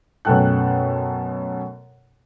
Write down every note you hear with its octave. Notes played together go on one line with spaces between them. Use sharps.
F#2 B2 A3 A4 G5 F#6